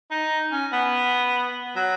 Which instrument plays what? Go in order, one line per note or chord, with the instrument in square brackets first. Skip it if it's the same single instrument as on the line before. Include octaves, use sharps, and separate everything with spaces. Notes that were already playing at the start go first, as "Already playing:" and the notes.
[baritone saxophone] D#4
C#4
B3
F#3